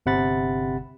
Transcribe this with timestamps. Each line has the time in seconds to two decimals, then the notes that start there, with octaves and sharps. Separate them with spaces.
0.06 G1 C3 F#5 B5 A6